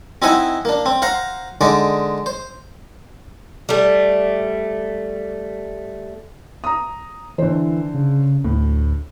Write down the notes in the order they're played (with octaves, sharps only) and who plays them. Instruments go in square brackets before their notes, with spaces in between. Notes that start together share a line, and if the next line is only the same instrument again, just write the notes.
[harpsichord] C4 D#4 E4 E5 F#5 G#5
A#3 D4
C4
C5 F5 F#5 A#5
D3 G#3 D#4 D5
C5
[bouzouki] G3 A3
[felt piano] A#5 D#6
[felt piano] D3 C5 [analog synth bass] E3
[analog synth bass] C#3
[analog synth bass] D2 [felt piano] A2